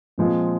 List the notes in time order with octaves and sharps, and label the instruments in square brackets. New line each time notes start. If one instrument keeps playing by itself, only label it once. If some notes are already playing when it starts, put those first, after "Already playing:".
[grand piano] A#2 F3 G#3 C4